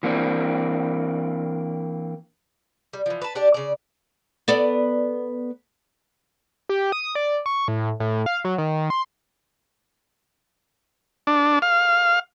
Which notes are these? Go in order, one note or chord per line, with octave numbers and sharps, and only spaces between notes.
E3 A#3 C4 D4
G3
E3 F3
B4 A5
D4 G4 D5
C#3 D5
B3 A4 D5
G4
D#6
D5
C#6
A2
A2
F5
F#3
D#3
C6
D4
F5